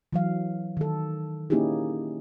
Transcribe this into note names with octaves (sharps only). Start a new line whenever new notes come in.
E3 F#3 F5
D#3 A4
A#3 C#4 D#4 E4 G4 G#4